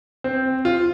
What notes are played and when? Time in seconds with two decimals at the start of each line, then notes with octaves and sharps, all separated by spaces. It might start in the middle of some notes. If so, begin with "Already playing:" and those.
0.24 C4
0.65 F4